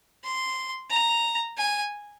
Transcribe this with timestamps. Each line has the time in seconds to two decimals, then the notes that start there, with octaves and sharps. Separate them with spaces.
0.24 C6
0.90 A#5
1.57 G#5